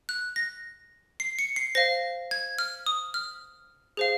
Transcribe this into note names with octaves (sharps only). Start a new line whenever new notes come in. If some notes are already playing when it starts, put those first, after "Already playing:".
F#6
A#6
C7
C#7
C7
C5 F5 A#6
G#6
F6
D#6
F6
G#4 C5 F5